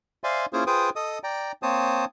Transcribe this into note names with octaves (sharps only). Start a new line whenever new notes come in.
C5 D5 E5 F5 G#5 C6
A#3 C#4 E4 F4 G#4 C5
F4 G#4 B4 C5 G5 D#6
A4 D#5 D#6
D5 G5 A#5
A#3 C4 C5 C#5 A5 D#6